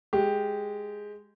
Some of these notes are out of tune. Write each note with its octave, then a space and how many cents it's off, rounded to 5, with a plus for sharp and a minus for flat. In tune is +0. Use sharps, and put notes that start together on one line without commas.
G#3 +0 G4 +0